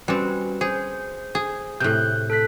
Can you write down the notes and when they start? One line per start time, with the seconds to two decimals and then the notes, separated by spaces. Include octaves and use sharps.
0.08 G3 C4 C#4 F#4 B4
0.61 G#4 C5
1.35 G#4
1.80 A2 C3 F#6 G6
2.30 A4 F#6 B6